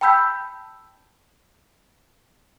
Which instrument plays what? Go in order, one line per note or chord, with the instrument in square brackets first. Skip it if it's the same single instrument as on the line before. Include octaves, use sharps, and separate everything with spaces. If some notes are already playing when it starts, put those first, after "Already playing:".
[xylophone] G5 A5 B5 E6 G6 B6